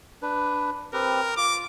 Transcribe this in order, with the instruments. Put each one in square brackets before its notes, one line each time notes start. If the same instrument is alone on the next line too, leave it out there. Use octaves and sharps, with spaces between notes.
[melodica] D4 B4
[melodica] C4 G4 B4 [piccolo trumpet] A#4
[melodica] F4 [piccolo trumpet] D6